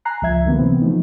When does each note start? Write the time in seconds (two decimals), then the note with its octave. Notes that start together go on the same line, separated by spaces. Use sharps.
0.05 G#5 A#5 F#6 C7
0.22 C#2 F3 E5 G#6
0.45 D3 D#3 F#3 A#3 B3
0.59 C3 E3 B3 C4
0.81 F3 A3 D#4